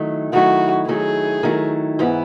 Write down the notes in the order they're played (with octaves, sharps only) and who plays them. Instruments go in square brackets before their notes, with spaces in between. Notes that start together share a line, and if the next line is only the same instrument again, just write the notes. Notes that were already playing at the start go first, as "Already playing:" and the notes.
Already playing: [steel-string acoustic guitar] D#3 F#3 A3 E4
[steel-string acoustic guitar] D#3 F#3 A3 E4 [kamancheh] F#4
[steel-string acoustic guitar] D#3 F#3 A3 E4 [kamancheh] G#4
[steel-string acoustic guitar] D#3 F#3 A3 E4
G#2 E3 B3 E4